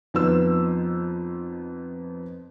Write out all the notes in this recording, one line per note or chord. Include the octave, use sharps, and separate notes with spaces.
F2 F3 B3 D#4 C5 E6